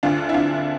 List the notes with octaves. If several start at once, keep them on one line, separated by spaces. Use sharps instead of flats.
D2 D3 D4 F4
E4
D4 F4